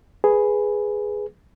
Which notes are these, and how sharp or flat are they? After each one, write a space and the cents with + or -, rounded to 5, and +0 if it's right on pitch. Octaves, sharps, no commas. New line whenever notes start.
G#4 +0 B4 +0